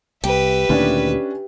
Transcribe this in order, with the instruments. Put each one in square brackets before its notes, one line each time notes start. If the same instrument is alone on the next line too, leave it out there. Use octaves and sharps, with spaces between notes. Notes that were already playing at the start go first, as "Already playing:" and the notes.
[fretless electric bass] C2 [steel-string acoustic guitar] G4 [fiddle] B4 E5
[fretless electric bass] D2 A#2 D#3 [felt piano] C#4 D4